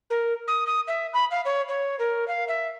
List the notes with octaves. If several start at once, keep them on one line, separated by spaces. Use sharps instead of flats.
A#4
D#6
D#6
E5
B5
F5
C#5
C#5
A#4
F5
E5